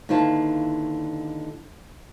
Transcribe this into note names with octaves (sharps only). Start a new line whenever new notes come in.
D#2 D3 E4 F4 B4 A5